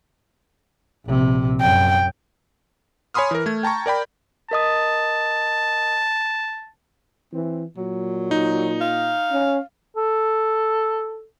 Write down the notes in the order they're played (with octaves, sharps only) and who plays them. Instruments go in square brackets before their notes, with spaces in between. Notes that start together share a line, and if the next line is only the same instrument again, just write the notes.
[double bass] A#1 C3
[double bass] F#2 [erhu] G5
[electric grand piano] C#5 G#5 B5 C6 D#6 F6
E3 A#4
A3 G#6
G5 A5 A#5 C#6
A#4 D5 G5 B5
[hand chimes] A#4 D#5 D#6 [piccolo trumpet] A5
[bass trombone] E3 [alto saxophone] C4
[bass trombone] A#2 [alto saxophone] F#3
[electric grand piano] D#4
[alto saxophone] F5
[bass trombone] C#4
[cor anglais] A4